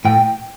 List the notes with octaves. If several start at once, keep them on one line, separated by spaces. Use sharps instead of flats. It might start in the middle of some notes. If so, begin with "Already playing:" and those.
A2 G5